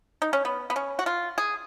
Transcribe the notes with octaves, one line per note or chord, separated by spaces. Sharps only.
D#4
C#4
B3
B3
C#4
F#4
F4
G#4